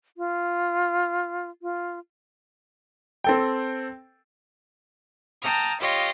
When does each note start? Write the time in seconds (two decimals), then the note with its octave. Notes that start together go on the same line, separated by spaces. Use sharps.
0.17 F4
1.62 F4
3.24 C4 A4 G5
5.41 G5 A5 A#5 D#6 F6
5.80 F4 G4 C#5 D#5 F5